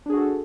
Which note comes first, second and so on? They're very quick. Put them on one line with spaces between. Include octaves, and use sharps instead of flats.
D4 G#4 F#4 A4